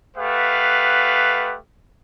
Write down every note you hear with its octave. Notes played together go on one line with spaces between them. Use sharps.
A3 G4 B4 F5 F#5